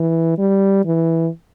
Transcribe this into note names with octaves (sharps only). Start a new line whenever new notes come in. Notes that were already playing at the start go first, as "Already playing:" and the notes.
Already playing: E3
G3
E3